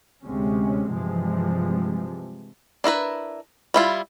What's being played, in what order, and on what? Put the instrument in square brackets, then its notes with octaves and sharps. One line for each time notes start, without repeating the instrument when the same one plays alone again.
[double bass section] D2 C3 G#3 C#4
G2 C3 E3 F3 G#3
[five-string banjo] D4 E4 A#4 B4
G3 E4 F4